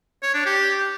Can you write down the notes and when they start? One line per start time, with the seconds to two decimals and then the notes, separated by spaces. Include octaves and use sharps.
0.23 C#5
0.34 D4
0.46 G4